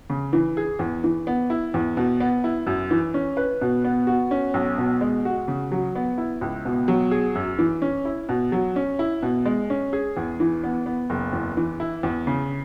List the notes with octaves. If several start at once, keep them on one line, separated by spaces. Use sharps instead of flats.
C#3
E3
G#4
E2
E3
B3
E4
E2
B2
B3
E4
F#2
E3
C#4
B4
B2
B3
F#4
C#4
B1
B2
G#3
F#4
C#3
F#3
B3
E4
C#2
B2
F#3
G#4
F#2
E3
C#4
E4
B2
F#3
C#4
E4
B2
G#3
C#4
G#4
E2
E3
B3
B3
F#1
E2
E3
E4
E2
C#3